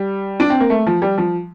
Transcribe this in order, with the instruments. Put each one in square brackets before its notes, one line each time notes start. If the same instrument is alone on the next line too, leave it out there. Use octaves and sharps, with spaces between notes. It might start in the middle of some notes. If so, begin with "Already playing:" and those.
Already playing: [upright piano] G3
D4
C4
A#3
A3
F3
G3
F3